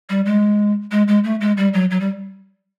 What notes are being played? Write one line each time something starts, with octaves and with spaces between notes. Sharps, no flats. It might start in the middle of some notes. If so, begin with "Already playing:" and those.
G3
G#3
G#3
G#3
A3
G#3
G3
F#3
F#3
G3